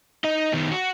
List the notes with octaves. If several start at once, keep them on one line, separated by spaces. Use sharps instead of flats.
D#4 D#5
D#3 B3
F#4